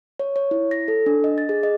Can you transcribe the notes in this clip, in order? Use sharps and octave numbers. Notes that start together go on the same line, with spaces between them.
C#5
C#5
E4
A#6
A4
D4
D#5
A6
G#4
D#5